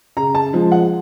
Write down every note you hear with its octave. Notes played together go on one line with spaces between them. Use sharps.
C#3 A#5
A5
F3 G#3
F#5